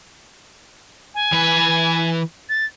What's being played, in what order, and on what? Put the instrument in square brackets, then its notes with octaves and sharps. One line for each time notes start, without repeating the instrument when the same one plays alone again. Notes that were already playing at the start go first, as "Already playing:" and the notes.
[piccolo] G#5
[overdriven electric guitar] E3 B4
[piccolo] A6